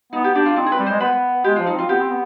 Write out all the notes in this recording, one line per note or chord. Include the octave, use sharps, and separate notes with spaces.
B3 D#4
G4
D4 G4
F4
C4 D#4
G#4
B4
G3
G#3 C5
B3 B4
G#3 G4
F4
F3
D#4
C4 F4
B3 G4
C4
B3